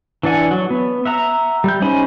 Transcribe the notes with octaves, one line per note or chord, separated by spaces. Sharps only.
E3 D4 D5 F#5 G#5
F#3
B3
E5 F#5 A#5
G3 G6
C#4 D#4 C5 G#5 B5